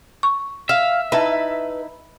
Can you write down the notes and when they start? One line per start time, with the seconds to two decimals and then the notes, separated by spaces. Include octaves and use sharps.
0.23 C#6
0.69 E5 F5
1.12 D#4 E4 B4 A5